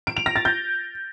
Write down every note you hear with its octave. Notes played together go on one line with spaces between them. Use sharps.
D7
F7
A#6
A6
G6